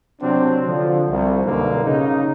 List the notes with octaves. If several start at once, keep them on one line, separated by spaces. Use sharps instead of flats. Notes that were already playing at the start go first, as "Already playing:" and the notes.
C3 F#3 C4 D4
D3 F3
C2
B1 G2 B2 D3 A#3
C#3 D#4